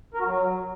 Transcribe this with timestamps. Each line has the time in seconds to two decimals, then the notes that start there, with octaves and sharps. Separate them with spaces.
0.14 A#4
0.20 F#4
0.26 F#3